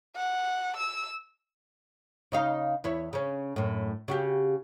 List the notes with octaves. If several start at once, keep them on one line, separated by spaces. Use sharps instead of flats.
F#5
E6
C#3 D#4 F5
E2 E4 C#5
C#3 C#4
F#2 A2
C#3 F#4 G4